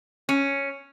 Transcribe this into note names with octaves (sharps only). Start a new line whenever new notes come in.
C#4